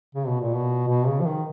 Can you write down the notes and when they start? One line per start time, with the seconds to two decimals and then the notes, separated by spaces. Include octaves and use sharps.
0.15 C#3
0.27 B2
0.41 A#2
0.54 B2
0.88 B2
1.07 C#3
1.20 F3
1.26 D#3